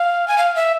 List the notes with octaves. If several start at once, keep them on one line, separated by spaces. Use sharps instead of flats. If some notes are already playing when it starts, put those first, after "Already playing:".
Already playing: F5
G#5
F5
E5